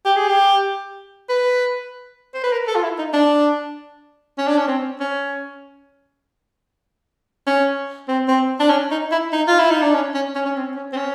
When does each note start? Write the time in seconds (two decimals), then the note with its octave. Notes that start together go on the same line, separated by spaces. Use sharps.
0.05 G4
0.16 G#4
0.27 G4
1.29 B4
2.34 C5
2.43 B4
2.52 A#4
2.67 A4
2.75 F4
2.83 E4
2.98 D#4
3.13 D4
4.38 C#4
4.48 D4
4.58 C#4
4.68 C4
5.00 C#4
7.47 C#4
8.08 C4
8.28 C4
8.60 D4
8.70 C#4
8.91 D#4
9.11 E4
9.32 D#4
9.47 F4
9.59 E4
9.71 D#4
9.82 D4
9.94 C#4
10.14 C#4
10.35 C#4
10.45 C#4
10.56 C4
10.76 C#4
10.93 C4
10.96 C#4